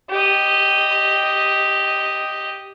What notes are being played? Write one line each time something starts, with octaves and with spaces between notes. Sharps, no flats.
G4 D#5